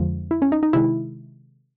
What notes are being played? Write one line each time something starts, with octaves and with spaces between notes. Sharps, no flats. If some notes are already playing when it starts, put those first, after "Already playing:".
Already playing: F2 D3 F3 G#3
E4
C#4
D#4
D#4
C3 D#3 G#3 E4